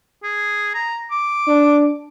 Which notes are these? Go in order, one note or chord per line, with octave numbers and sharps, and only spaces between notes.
G#4
A#5
D6
D4